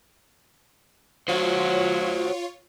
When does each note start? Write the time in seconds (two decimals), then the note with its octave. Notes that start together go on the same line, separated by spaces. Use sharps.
1.28 F#3 F4 F#4 C5 C#5